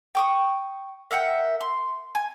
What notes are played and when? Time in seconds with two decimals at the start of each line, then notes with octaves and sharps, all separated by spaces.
0.15 G5 C#6 D#6
1.11 A#4 E5 F#5 G5
1.61 C6
2.15 G#5